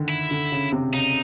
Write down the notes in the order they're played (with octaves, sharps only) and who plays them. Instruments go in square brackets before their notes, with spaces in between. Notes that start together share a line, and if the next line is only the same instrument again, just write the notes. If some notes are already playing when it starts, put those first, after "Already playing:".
Already playing: [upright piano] D3 D#3
[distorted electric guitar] E4
[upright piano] D3
C#3
C3
[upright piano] C#3 [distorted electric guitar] D#4